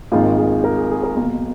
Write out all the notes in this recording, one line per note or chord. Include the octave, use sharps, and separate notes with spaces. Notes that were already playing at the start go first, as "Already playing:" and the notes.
G#1 G#2 D#3 A#3 F4
G#4
A#4
G#4
G#4
A#4
B1 B2 A#3